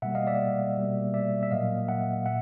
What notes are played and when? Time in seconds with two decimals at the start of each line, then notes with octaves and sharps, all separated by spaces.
0.02 B2 G3 A#3 E5 F#5
0.15 D#5 F5
0.27 D5 E5
0.77 B2 G3 A#3
1.14 D5 E5
1.43 E5
1.51 A#2 F#3 A#3 D#5 F5
1.89 E5 F#5
2.26 A#2 E5 F#5